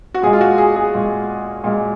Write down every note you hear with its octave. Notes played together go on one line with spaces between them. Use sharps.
F#4
A#2 G#3 G#4
F4
F#4
G#4
G#4
A#2 G#3
A#2 G#3